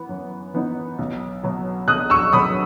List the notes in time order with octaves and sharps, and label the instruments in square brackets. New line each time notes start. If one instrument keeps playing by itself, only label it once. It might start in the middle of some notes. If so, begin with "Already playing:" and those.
Already playing: [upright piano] E3 B3
F#2
E3 B3 D#4
B1
B2 F#3 B3
[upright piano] B1 [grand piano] D#6 F#6
[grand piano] C#6 E6
[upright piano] B2 F#3 B3 [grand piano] B5 D#6